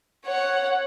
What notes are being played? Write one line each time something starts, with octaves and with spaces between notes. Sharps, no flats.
C#5 F#5